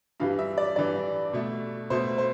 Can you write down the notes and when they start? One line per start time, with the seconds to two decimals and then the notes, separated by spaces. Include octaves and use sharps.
0.20 G2 E3 G3 F5
0.39 E5
0.58 D5
0.76 G2 E3 G3 D5
1.33 B2 A3
1.90 B2 A3 C5
2.18 C5